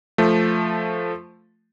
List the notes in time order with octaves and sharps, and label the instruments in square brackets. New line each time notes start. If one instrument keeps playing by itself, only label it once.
[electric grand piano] F3 A3